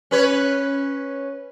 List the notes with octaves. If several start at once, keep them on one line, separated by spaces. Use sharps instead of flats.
C#4 B4 C#5